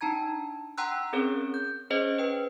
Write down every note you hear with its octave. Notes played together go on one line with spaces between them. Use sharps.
D4 D#4 A5 A#5 G#6
F#5 G5 A#5 C6 E6 F#6
C4 C#4 G#4 A#4 C#5
G6
C#4 G#4 C5 C#5 D#5
B4 C5 G5